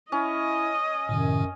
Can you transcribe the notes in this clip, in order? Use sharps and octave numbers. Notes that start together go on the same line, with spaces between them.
C#4 E4 D#5
F#2 A2 C3 D#3